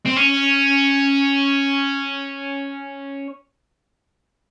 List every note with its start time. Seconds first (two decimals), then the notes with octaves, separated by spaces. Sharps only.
0.06 C4
0.16 C#4